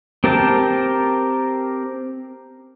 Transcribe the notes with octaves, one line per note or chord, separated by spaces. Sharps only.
C4 G4 A#4 G5 A5